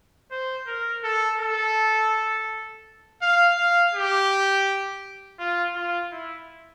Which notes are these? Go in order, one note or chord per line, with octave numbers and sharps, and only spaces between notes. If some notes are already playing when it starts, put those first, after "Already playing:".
C5
A#4
A4
A4
F5
F5
G4
F4
F4
E4